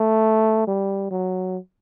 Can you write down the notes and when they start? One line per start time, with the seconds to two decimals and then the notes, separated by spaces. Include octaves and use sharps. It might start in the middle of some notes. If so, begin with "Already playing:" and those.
Already playing: A3
0.67 G3
1.11 F#3